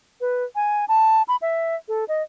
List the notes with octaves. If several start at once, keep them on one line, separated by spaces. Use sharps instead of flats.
B4
G#5
A5
B5
E5
A4
D#5